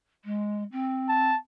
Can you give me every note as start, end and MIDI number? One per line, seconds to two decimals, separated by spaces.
0.25 0.63 56
0.72 1.32 60
1.09 1.37 81